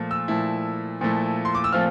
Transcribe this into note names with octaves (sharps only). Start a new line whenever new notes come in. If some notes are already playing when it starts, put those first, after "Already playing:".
Already playing: A#2 F3 A3
E6
A#2 F3 A3 E4
A#2 F3 A3 E4
C6
D6
E6
A#2 F3 A3 C4 F4 F6